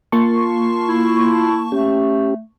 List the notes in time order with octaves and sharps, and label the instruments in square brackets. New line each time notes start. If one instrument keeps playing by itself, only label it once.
[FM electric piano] A#3 A5 C#6 [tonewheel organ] F4 C6
[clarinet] E4
[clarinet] A3 [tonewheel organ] C#4 G4